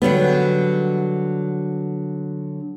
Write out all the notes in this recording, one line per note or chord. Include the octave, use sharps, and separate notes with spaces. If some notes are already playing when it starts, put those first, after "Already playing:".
D3 F#3 G3 B3